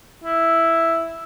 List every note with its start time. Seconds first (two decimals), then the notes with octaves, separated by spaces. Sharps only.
0.24 E4